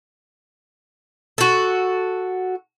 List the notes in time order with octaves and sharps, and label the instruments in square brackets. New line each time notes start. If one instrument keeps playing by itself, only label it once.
[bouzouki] F#4 A4